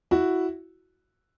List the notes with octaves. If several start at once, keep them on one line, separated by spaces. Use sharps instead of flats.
E4 F#4